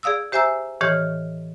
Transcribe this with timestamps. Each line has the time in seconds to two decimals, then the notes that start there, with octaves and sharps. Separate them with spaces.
0.03 G#4 D5 F5 D#6 E6
0.32 G4 C5 E5 G#5 A#5 E6
0.81 A2 D#3 E3 G4 C#5 F6